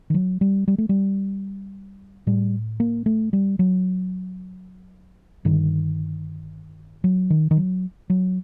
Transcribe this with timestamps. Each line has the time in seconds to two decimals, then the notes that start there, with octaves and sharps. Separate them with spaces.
0.10 D#3
0.14 F#3
0.41 G3
0.68 G3
0.78 A3
0.89 G3
2.27 A2 G3
2.80 A#3
3.06 A3
3.33 G3
3.59 F#3
5.45 G2 D3 D#3
7.04 F#3
7.30 D#3
7.51 D#3
7.57 F#3
8.10 F#3